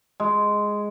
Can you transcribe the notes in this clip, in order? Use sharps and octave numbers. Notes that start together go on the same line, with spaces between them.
G#3